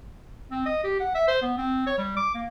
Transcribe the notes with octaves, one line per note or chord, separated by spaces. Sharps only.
C4
D#5
G4
F#5
E5
C5
B3
C4
C#5
G3
D6
A#3